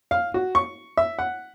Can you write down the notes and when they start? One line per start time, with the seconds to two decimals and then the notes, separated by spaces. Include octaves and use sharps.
0.11 F5
0.34 F#4
0.55 C#6
0.97 E5
1.19 F#5